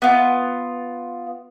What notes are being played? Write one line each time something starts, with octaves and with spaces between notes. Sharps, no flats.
B3 F4